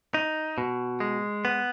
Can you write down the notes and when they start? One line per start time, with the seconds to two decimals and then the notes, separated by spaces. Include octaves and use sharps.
0.14 D#4
0.58 B2
1.00 G#3
1.45 B3